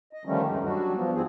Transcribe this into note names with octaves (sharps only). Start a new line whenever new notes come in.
D#5
D3 D#3 F3 G3 A3 C#4
D2 G2 E3 G#3 D#4
F#3 G3 D4 F#4
F3 B3
G#2 F3 C4 G#4